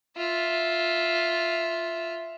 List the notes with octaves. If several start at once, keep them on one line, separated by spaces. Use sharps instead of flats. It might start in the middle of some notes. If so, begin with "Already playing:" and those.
F4 E5